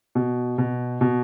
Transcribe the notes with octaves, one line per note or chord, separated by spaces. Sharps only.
B2
B2
B2